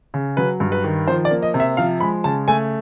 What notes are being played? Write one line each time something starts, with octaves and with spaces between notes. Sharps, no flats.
C#3
F#3 B4
G2
B4
D#3
F3 C5
D5
A#3
D#5
C3
E5
F3 F5
G#3 B5
C#3 A5
A3 G#5